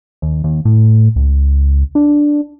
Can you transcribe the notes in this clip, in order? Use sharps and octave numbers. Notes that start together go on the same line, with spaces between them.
D#2
D#2
A2
C#2
D4